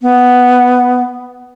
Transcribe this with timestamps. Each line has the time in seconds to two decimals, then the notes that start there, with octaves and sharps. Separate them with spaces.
0.02 B3